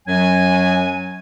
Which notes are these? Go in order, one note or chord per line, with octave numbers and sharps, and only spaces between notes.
F#2 F#3 G#5